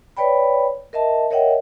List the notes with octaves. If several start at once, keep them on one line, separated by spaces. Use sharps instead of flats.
B4 C#5 D5 G5 B5
A#4 D#5 E5 A5
A#4 C#5 D#5 E5 F#5 G5